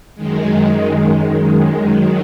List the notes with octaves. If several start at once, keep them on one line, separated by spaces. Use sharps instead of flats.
F#2 D#3 G#3
D#3 F#3